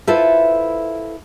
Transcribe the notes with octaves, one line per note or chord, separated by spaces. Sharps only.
E4 F4 A4 B4 C5 E5